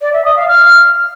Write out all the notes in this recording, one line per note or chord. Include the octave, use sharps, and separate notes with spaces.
D5
E5
D#6
F5
F6